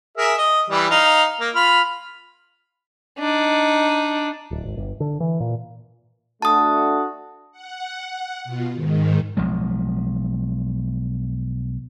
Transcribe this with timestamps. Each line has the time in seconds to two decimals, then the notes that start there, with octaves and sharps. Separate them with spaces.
0.17 G#4 A#4 E5
0.38 D#5
0.70 E3 G3
0.90 D#4 F5
1.40 A#3
1.55 F4 B5 F6
3.19 D4 D#4
4.51 D1
4.65 G#1
4.77 G1
5.00 D3
5.20 E3
5.40 A#2
6.42 A3 D4 F#4 A5 D#6
7.52 F#5
8.04 F#5
8.44 B2 F4
8.73 G#2 D#3
9.37 B1 F3 G#3